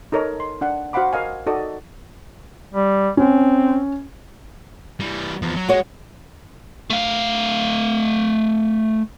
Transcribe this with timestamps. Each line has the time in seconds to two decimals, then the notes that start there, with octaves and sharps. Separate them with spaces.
0.12 D#4 A4 A#4 C#5 D#5 A#5
0.40 C6
0.61 D4 F#5
0.93 F#4 C5 F5 F#5 B5 D6
1.13 A#4 D#5 F5 G#5
1.47 D#4 F#4 A4 D5 D#5
2.74 G3
3.17 C4 C#4
5.00 E3 G3
5.42 E2 F3
5.56 F#3
5.69 G#3 F#4 C#5
6.90 A3 F5